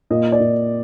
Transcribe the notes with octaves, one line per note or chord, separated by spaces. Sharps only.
A#2 D#5
D5
A#2